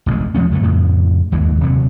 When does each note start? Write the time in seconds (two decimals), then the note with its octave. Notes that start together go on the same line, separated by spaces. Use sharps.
0.06 E1 A1 D2 G#3
0.35 E2 F3 A3 C#4
0.51 C#2 F#2 D3 A3
0.63 F2 A2 C#3
1.32 G1 D#2 E3 G#3
1.60 D#1 C3 E3 F#3